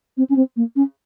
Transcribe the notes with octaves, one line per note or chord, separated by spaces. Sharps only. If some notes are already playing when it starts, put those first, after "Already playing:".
C4
C#4
C4
A#3
C#4